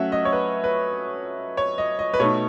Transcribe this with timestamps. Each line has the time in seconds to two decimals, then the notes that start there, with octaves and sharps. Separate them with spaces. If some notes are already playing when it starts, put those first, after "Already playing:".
Already playing: F#3 A3 C#4 E5 F#5
0.12 D#5
0.25 C#5
0.33 B4
0.64 B4
1.57 C#5
1.78 D#5
1.99 D#5
2.14 B4
2.19 B2 A3 D#4 C#5